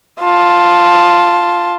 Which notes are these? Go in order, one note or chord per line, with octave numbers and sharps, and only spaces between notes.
F4 A5